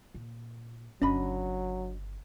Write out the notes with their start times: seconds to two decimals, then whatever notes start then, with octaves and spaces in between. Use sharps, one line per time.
0.14 A#2
1.02 G1 C#3 F#3 C#4 D4 D#5 B5